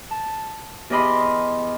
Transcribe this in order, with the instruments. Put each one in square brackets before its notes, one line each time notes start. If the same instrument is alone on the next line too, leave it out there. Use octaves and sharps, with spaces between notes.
[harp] A5
E2 G4 D#5 B5 C6